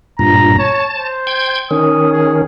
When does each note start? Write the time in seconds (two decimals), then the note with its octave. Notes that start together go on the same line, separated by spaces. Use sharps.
0.19 G2 A#2 A#5
0.59 C#5 A5
0.95 C5
1.27 G5 G6 G#6
1.71 D#3 C#4 D#6
2.12 G#4